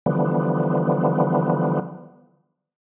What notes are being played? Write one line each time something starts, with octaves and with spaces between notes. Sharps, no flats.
D3 E3 F3 G3 B3